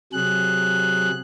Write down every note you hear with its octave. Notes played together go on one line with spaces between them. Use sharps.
C3 F#3 G#4 F#6